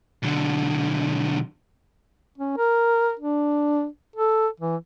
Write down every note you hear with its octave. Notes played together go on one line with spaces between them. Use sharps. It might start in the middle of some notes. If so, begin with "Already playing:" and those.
B1 D3
C#4
A#4
D4
A4
E3